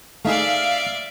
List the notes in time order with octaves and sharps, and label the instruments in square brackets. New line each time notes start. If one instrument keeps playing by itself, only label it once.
[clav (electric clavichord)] A3 D#4 G#4 [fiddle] D5 E5 [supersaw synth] F5